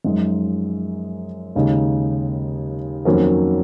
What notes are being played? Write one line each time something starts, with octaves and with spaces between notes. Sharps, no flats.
F#2 F3 G#3 D#4
D#2 C#3 G#3 D#4
F2 D#3 F#3 A#3 C#4